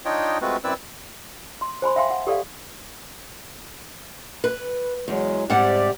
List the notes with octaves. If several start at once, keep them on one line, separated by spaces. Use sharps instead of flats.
D4 D#4 F4 C#5 D#5 G5
G#3 A3 C4 F4 F#4 B4
F#2 C4 E4 B4 D5 E6
C6
C5 G#5 B5 C6
E5 F5 G5 G#5 C6
F#5
G4 A4 D5 F5
B4
E2 F#3 G#3
G#2 C3 G3 G4 D5 F#5